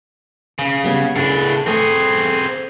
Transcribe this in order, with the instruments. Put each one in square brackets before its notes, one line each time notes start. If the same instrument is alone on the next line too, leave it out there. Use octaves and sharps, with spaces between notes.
[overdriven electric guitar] C#3
[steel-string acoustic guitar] G3 B3 C#4
[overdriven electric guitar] A2 D4 [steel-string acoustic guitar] C#3 G#4
[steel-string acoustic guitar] A3 B4 [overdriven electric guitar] C4 G#4